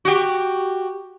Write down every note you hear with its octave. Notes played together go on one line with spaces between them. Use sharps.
F#4 G4